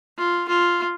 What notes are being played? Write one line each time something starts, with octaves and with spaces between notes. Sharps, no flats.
F4
F4